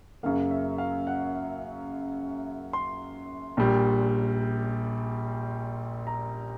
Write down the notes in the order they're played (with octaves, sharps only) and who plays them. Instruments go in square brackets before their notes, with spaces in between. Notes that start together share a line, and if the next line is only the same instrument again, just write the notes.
[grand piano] F#2 C#3 F#3 A#3 F5
E5
F5
F#5
C6
A#1 A#2 G3
A#5